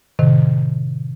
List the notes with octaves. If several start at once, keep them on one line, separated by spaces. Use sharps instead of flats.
A2 C3 D#3